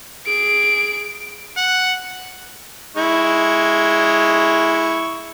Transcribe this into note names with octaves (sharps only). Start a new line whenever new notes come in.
G#4 D7
F#5
G#3 E4 C#6